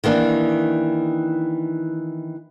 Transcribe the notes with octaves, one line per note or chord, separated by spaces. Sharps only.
D#3 E3 A#3 D4